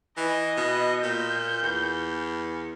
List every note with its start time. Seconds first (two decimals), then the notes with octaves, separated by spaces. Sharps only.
0.17 E3 D#5
0.57 B2
1.03 A#2 G6
1.63 E2